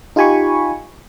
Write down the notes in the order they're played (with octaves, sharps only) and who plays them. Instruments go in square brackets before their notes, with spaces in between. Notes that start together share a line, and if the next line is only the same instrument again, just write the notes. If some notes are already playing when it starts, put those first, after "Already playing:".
[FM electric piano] D#4 F4 G4 G#5 B5 C#6